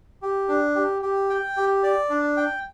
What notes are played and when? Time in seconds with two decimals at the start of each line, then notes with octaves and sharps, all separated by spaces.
0.22 G4
0.48 D4
0.75 G4
1.02 G4
1.30 G5
1.57 G4
1.83 D5
2.10 D4
2.37 G5